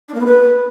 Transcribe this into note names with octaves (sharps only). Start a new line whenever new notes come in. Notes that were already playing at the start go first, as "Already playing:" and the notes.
D4
A#3
B3
B4